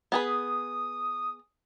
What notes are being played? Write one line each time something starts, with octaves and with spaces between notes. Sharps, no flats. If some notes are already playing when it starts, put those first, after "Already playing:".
B3 G#4 B4 D#6